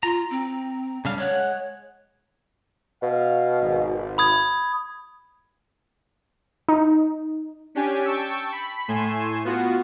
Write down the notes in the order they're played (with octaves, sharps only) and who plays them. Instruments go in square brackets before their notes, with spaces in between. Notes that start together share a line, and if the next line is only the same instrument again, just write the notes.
[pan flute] F4 [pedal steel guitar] A#5
[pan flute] C4
[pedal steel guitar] C#3 D4 F5 [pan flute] G3
[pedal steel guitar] G#3 F#5 [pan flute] C#5
[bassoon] B2 [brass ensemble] F5
[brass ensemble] G#1
[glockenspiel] B5 D#6 G#6
[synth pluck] D#4
[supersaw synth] C#4 D4 G4 G#5
G5 A5 C#6 E6
B5
A2 A3 G#5 C6 E7
B3 F4 F#4